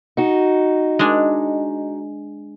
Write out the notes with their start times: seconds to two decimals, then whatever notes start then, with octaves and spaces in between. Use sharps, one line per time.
0.17 D#4 F#4
0.99 G#3 D4